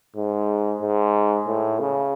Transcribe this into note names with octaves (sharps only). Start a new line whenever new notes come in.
G#2
G#2
A2
C#3